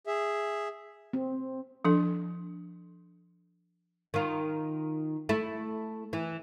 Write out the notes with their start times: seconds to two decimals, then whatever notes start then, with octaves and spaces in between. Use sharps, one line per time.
0.07 G#4 E5
1.13 C4
1.85 F3 D4 A4
4.14 D#3 F4
5.29 A3 E4
6.13 E3